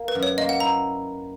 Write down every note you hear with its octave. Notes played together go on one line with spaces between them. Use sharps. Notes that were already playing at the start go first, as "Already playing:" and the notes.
Already playing: A#3
B4
F#2
C#5
A#3 D#5
F#5
E4 A#5